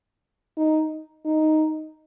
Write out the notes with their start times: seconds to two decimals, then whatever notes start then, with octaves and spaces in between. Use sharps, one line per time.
0.57 D#4
1.25 D#4